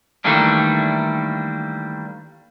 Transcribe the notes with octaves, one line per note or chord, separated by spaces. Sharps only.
D#3 E3 G3 A3 A#3 D4